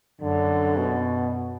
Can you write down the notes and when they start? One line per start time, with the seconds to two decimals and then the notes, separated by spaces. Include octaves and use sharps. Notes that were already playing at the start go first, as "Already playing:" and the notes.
0.21 F#2 D3
0.77 B2